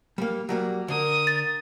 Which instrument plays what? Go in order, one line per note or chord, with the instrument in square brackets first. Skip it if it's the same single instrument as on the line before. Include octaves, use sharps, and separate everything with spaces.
[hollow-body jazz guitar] G3 A#3
F#3 G3 A#3
[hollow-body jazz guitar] D3 [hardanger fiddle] A#4 D#6
[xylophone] A6